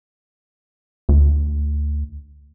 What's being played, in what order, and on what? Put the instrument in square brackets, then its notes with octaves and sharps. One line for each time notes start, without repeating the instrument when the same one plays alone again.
[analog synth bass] D2